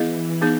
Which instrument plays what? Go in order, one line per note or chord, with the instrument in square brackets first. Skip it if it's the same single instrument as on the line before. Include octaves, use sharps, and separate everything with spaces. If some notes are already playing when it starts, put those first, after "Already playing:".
Already playing: [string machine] E3 [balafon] B3 E4 G#4 D#5
[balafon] B3 D#4 G#4